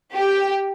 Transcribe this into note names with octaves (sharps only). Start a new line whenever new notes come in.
G4